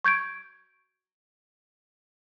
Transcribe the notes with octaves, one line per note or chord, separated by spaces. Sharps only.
C#6 G6 G#6 D7